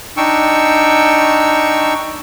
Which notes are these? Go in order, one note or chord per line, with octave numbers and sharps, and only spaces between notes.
D4 D#4 G5 C#6 E6